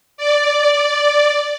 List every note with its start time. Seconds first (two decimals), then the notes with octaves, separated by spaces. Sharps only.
0.17 D5